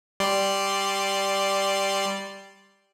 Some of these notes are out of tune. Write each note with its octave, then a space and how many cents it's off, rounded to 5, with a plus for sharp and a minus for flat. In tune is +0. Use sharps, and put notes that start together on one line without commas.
G3 +0 D5 +0 C6 +0